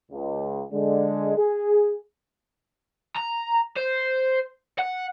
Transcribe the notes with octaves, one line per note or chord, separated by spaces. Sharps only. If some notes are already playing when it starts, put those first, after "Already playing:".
C#2
D3 G#3
G#4
A#5
C5
F#5